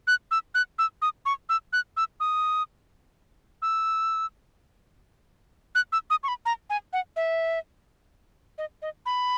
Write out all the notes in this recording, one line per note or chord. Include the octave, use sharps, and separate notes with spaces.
F#6
E6
F#6
E6
D#6
C#6
E6
F#6
E6
D#6
E6
F#6
E6
D#6
C#6
B5
A#5
G#5
F#5
E5
D#5
D#5
B5